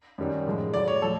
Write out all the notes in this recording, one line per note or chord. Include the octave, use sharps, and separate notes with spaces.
F#2 D#3 G3
A2 F3 G#3
A2 F#3 D5
C#5
F3 A4